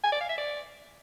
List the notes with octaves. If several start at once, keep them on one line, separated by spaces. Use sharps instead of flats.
G#5
D5
F5
E5
D5